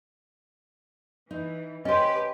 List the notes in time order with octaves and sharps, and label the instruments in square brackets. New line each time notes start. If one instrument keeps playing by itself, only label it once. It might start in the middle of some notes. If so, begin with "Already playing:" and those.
[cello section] E3 [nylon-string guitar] D#4
[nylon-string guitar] C#4 C5 [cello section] G4 B4 [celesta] D#5